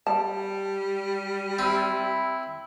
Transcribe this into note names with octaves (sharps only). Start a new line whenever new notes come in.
G3 A5
C4 E4